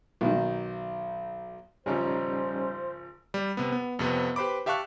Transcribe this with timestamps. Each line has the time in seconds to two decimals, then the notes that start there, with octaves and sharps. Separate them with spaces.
0.21 B1 D#3
1.86 G#1 C#3 F3 G3 C#4 D#4 C5
3.34 G3
3.57 C3 B3
3.72 B3
3.99 F2 C3 B3
4.36 G4 B4 C5 B5 D6
4.66 G4 E5 F5 A5 C#6 F#6